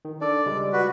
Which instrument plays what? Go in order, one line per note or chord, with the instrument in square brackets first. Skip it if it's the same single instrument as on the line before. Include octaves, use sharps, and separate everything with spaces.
[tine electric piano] D#3
[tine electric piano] D4 A4 [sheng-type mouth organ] D5
[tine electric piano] C#2 G3 G#3
[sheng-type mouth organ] F#4 B4